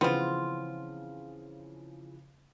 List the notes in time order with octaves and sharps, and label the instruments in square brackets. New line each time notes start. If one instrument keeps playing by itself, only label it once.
[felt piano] C#3 E3 F3 [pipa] B3 F4 [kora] C4